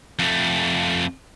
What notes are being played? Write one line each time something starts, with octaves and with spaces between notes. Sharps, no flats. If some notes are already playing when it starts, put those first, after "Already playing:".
F2 A3